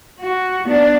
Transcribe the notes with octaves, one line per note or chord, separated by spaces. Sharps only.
F#4
B3 D4